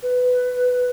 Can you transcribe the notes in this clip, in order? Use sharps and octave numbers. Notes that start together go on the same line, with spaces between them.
B4